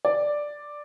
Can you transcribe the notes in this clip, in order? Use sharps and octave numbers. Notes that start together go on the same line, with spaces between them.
D5